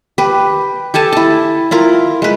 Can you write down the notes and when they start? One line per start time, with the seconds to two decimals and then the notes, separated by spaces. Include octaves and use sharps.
0.18 G4 B4
0.94 G4 A4 G#5 A5
1.12 E4 A5
1.71 E4 F4 A#4
2.22 G#3 B4